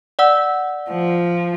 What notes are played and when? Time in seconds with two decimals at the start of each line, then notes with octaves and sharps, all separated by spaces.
0.19 D5 F#5 E6
0.91 F3